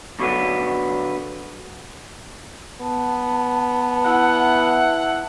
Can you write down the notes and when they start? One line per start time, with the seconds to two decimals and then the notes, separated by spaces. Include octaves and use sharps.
0.19 G2 B2 D3 F#3 B3
2.81 B3 A5
4.06 E4 F#5